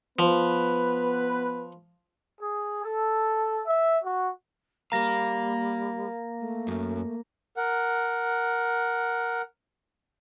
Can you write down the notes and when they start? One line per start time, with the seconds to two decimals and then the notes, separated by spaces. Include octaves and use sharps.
0.19 F3 B3 B4
2.40 G#4
2.83 A4
3.66 E5
4.03 F#4
4.92 G3 A#3 A#4 F5 A#5 A#6
6.40 A3
6.68 F#2
7.57 A#4 F#5